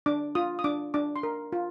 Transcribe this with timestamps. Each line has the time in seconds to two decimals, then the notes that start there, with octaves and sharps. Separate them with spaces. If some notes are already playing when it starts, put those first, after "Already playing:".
0.06 D4 D6
0.35 F4 D#6
0.59 D#6
0.64 D4 D6
0.94 D4 D6
1.16 C6
1.23 A#4
1.52 F4